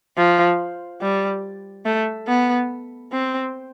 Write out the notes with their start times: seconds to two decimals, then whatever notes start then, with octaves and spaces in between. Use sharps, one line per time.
0.18 F3
1.02 G3
1.86 A3
2.28 B3
3.13 C4